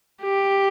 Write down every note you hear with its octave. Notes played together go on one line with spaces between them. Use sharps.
G4